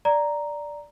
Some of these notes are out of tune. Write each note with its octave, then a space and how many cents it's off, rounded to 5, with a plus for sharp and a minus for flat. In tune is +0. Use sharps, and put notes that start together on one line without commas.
D5 +0 A#5 +0